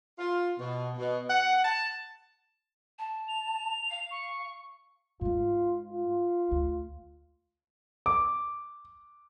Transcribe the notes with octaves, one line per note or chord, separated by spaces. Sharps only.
F4
B2
B2
F#5
A5
A5
F7
F5
C#6
G#2 G#3 F4
F4
D2
D6